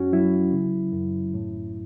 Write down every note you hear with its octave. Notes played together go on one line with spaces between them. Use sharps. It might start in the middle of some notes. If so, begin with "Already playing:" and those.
Already playing: F#2 C#4 F#4
F#3 E4
C#3
F#2
A2